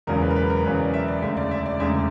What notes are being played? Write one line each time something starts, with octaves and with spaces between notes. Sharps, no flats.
E1 E2 C#3 F#3 A#4
B4
A#4
B4
A#4
E1 E2 C#3 F#3 B4
D5
E5
D5
E1 D2 C#3 E5
D5
E5
D5
E1 D2 C#3 E5